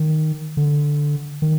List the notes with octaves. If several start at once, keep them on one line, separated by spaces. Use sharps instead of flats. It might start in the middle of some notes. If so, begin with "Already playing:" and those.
Already playing: D#3
D3
D#3